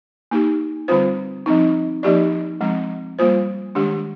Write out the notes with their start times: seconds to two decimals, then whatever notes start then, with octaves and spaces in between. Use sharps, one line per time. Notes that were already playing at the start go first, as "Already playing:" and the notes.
0.31 A#3 D#4 G4
0.88 D3 G3 C4 F4 C5
1.46 F3 C4 D#4
2.03 F3 A#3 D#4 G4 D5
2.61 F3 G#3 C4
3.19 G3 A#3 F4 C5
3.75 D#3 G#3 D4 G4